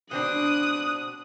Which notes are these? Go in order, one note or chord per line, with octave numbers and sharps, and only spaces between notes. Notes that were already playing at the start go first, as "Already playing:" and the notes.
B2 C4 D4 D#6 F#6